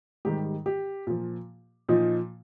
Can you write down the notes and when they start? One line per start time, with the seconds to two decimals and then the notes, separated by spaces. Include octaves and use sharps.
0.25 G#2 D#3 G3 G4
0.66 G4
1.07 A#2 F3
1.89 A#2 F3 D#4